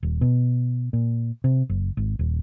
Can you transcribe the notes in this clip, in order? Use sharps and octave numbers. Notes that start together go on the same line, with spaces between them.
D#1
B2
A#2
C3
F#1
G#1
D#1